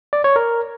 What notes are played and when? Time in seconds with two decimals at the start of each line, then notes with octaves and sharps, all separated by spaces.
0.13 D5
0.24 C#5
0.36 A#4